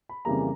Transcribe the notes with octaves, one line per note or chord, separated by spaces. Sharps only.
B5
F2 C#3 E3 G3 A#3 A#5